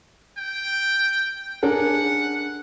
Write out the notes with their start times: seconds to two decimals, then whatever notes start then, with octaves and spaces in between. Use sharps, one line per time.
0.38 G5
1.63 D4 G#4 A#4 F#5